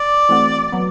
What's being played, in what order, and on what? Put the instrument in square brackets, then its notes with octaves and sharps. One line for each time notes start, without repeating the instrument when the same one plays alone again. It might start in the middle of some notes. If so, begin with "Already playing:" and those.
Already playing: [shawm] D5
[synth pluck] E3 A3 C4 F#4
F#3 B3